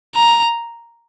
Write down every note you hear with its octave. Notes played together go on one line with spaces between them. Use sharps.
A#5